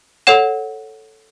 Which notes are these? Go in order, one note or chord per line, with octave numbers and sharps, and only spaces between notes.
A4 C#5 F#5 E7